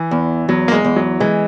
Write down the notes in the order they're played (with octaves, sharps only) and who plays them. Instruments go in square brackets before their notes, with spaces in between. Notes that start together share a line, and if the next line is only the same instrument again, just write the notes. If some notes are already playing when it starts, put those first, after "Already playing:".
Already playing: [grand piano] E3
[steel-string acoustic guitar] E2
[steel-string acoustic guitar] E2 [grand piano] F#3
[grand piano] A#3
G#3
[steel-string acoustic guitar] E2
[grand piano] F#3
[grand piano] E3 [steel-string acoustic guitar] G#3